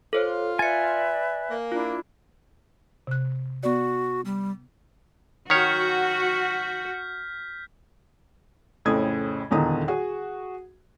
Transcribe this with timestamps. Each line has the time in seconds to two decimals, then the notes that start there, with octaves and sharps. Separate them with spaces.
0.13 F4 A4 C5 C#5
0.59 B4 D5 E5 G#5 A6 C#7
1.50 A#3
1.72 D4 E4 F4
3.07 C3 F#6
3.63 B3 F#4 D5
4.25 G3
5.50 D#3 F#4 C#5 F6 G6 B6
8.85 F2 A2 C#3 C4 D#6 G#6
9.50 D#1 E2 D3 D#3 A#5 D#6
9.88 F#4 G#4